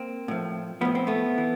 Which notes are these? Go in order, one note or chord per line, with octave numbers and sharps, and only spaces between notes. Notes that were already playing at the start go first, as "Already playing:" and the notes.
Already playing: A#3 C4
A2 F3
A2 F3 B3
C4
A3 B3
E3